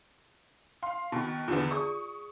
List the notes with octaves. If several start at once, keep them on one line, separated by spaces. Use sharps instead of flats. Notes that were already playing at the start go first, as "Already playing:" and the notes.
F5 C6
B2 D#3
E2 D3 B3 F4
G#4 D5 C#6 D#6 E6